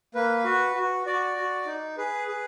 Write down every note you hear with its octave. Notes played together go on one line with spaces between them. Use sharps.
A#3 B4
F#4
F#4
F#4 D5
F#4
D#4
G#4 B4
G#4